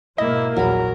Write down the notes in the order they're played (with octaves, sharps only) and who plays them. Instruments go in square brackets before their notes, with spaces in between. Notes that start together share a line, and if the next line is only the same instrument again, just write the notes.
[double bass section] G#2 B2 A#3 [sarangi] E4 [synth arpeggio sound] D#5
[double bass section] A#1 E2 [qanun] F#3 B5 [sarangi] A#4